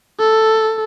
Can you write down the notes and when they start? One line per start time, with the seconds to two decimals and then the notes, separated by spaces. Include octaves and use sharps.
0.20 A4